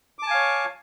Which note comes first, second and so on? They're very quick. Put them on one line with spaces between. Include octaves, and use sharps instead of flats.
D6 A5 G#5 F5 C#5